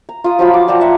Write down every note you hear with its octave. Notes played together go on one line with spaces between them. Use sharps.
A#5
F4 D#6
F3 F#3 F4 B5
D6
D5 G5 A5 A#5
E5 F#5